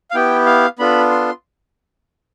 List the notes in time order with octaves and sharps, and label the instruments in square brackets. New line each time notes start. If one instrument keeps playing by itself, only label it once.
[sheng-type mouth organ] F5
B3 E4 G4 G5
F5
B3 D4 F4 A4 B5
C6